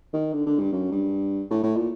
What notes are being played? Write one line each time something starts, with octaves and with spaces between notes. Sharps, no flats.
D#3
D3
D3
G2
F#2
G2
A2
A2
A#2